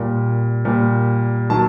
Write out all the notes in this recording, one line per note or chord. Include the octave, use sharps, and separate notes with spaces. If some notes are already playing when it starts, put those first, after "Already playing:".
Already playing: A#2 G3 A#3
A#2 G3 A#3
D#3 F#3 A#3 A5